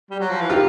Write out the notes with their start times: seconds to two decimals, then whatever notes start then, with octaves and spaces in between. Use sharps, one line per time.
0.11 G3
0.20 F#3
0.30 F3
0.41 E3
0.50 D#3 F4 G4